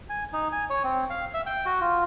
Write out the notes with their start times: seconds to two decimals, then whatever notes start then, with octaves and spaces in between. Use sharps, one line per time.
0.09 G#5
0.33 D#4
0.52 G#5
0.70 C#5
0.84 C4
1.10 F5
1.34 E5
1.46 G5
1.66 F#4
1.81 F4